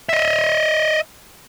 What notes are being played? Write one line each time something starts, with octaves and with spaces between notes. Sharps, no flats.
D#5 E5